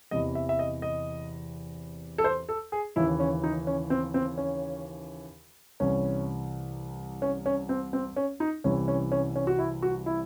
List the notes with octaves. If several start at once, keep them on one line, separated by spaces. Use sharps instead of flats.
E2 C3 E3 D#5
E5
E5
D#5
D#5
A4
C5
A4
G#4
D#2 C#3 E3 E4
C#4
D#4
C#4
C4
C4
C#4
C2 C3 E3 C#4
C#4
C#4
C4
C4
C#4
D#4
C2 C3 E3 C#4
C#4
C#4
C#4
F#4
E4
F#4
E4